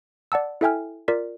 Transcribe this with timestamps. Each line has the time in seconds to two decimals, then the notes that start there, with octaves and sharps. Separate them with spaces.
0.32 D5 F#5 A5 E6
0.61 E4 A4 E5 G5 G#5 F6
1.08 F4 A#4 D5 B6